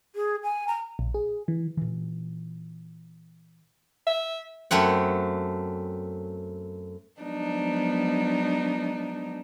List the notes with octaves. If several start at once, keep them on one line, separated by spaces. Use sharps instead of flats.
G#4
G#5
A#5
A#1
G#4
E3
A#2 E3
E5
F#2 A3 C4 F#5
F3 F#3 G#3 B3 D4 D#4